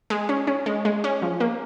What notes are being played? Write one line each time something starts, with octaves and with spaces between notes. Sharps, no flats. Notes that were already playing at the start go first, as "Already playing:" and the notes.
G#3
C#4
C#4
G#3
G#3
C#4
F3
A#3